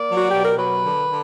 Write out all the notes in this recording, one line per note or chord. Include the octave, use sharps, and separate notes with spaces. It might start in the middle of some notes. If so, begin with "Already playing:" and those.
Already playing: A#3 D5
F#3
F#4
B2 G4
A#4
F#3 B4
D3
D3